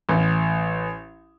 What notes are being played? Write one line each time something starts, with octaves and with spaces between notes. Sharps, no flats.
A1